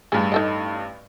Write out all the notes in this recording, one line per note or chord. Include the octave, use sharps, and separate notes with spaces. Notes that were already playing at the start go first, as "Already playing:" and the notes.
A1 G2 G#4
D#4 A4 D#5